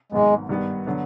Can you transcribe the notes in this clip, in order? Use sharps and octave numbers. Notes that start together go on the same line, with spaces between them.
G#1 G#2 D#3 F#3 G#3 B3
G2 D#3 G3 B3
D3 F#3 B3